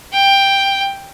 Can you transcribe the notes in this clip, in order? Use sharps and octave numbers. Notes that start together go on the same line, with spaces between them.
G5